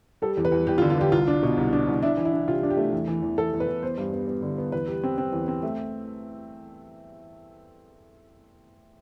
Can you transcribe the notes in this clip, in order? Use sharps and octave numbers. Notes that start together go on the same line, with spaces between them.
G3 A4
E2
B4
E2
E2 G4
F4
D3
F4
D3 G4
C2 F4
D4
B2
C2
D4
C2
D4 E4
E3
E4
D4
C3 F4
D4
G4
A3
E2
E3
E2
E2 A4
E2
B4
E2
B3 C5
G2
B3
B3
D3
B3
E2 B4
G3
C4
C4
E2
C4
A3